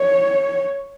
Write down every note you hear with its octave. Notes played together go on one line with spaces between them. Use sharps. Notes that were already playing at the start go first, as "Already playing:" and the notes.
Already playing: C#5